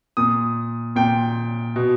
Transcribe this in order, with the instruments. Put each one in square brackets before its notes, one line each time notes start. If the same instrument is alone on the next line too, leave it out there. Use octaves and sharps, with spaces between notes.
[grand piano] A#2 D#6
A#2 G5
B2